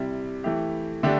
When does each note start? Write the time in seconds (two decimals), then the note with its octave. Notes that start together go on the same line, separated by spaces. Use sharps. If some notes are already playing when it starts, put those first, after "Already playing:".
Already playing: C3 G3 E4
0.44 E3 A3 E4 G4
1.03 D3 A3 D4 G4